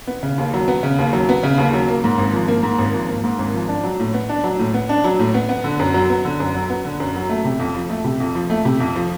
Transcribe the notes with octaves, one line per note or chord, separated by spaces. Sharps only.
B3
C#3
D#2
F#3
B3
C#3
D#2
F#3
B3
C#3
D#2
F#3
A#3
G#2
G#1
F3
A#3
G#2
G#1
F3
A#3
G#2
G#1
F3
D4
F#3
A2
B3
D4
F#3
A2
B3
D4
F#3
A2
B3
B3
D3
F#2
F#3
B3
D3
F#2
F#3
B3
D3
F#2
F#3
A3
C3
F2
F3
A3
C3
F2
F3
A3
C3
F2
F3